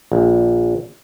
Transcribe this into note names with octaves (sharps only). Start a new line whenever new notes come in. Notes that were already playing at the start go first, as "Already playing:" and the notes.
A#1